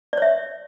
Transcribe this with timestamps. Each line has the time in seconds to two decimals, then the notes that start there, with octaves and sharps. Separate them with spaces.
0.13 D5
0.18 C#5
0.22 E5